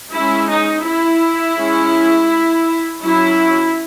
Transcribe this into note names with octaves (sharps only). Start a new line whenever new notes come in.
G#3 C#4 E4
D#4
E4
G#3 C#4
F#3 C#4 E4